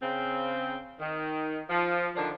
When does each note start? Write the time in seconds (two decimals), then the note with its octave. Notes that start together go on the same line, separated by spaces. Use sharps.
0.01 C#3 C4
1.00 D#3
1.70 F3
2.15 D3 D#3 F3 D4